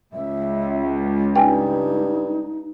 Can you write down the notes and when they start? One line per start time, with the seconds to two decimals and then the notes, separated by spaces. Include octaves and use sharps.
0.13 C#2 E5
1.36 G2 D#4 G5 G#5